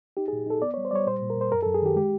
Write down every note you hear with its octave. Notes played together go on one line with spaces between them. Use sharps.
D#4 G4
G#4
A#2
D#4 A4
B3 D5
C#5
G3
C5
G3 C#5 D5
A#2 C5
A#2
A#4
A#2 C5
F#2 A#4
A4
F#2
G#4
D#3 G4
G#3 G4